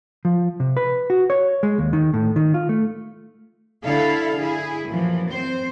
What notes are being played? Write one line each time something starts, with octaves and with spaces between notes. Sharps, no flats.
F3
C3
B4
F#4
C#5
G#3
D#2
D#3
A2
D#3
F4
A3
D3 E4 A4 F5
E4 G#4
F#2 A#2 E3 F3
C4 C5